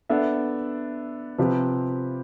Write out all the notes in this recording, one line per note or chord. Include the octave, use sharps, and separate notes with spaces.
B3 D4 A4 E5
C3 F3 C4 G4 B4